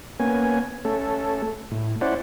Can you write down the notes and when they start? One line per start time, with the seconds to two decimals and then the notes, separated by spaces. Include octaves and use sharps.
0.20 A#3 B3 C#4 G#5
0.85 A3 C#4 A4
1.71 A2
2.01 C#4 E4 C5 D5 F#5